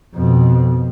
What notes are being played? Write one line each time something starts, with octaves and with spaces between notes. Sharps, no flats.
F2 B2